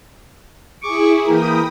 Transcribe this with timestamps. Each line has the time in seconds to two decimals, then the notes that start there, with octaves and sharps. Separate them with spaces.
0.82 E4 G#4 C#6 D6
1.27 E3 A#3 A#4 G5 B5 D#6